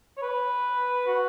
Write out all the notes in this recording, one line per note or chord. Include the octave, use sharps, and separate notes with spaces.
C#5
B4
F#4